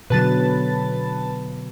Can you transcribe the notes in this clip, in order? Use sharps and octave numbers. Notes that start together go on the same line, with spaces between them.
B2 D3 F#3 B4 A5 A6